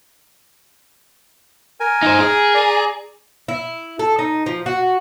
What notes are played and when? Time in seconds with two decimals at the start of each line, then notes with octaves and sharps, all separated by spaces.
1.80 A#4 G#5
2.03 D#4 C5
2.20 G#4
2.54 D5 A#5
3.48 E4
3.99 A4
4.19 D#4
4.46 F3
4.66 F#4